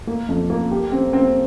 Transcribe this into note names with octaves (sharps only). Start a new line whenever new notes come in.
A#3
F2
A#3
G4
C4
C4